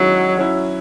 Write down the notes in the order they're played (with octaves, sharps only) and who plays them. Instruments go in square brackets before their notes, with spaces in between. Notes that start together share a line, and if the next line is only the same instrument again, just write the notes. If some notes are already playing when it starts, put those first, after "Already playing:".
Already playing: [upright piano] D#3 G#3 C#4 E4 [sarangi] F#3
[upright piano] F#3 C#4 E4